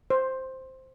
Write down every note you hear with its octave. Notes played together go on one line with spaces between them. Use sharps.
C5